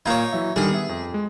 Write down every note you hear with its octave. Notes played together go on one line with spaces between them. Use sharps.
A#2 D#4 C#5 F5 G#6
E3 F#3 E5
D3 D#3 G3 G#4
B3 E5
F2
G#3